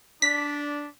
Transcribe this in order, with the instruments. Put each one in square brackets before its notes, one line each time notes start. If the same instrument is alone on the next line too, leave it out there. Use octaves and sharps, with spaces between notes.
[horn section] D4 [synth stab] B6